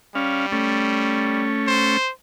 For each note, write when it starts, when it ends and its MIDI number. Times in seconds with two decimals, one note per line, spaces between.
0.15 1.47 55
0.15 0.46 61
0.15 0.46 77
0.52 1.97 57
0.52 1.97 61
1.67 2.11 72